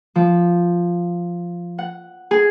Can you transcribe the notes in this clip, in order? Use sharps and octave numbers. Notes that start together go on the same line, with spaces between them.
F3
F#5
G#4